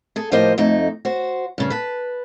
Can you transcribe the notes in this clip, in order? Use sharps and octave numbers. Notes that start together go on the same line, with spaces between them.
G#4 A4
A2 F3 A#3 G4 C5 D#5
F2 A3 D#4
F#4 C5
G2 C#3
B4 A5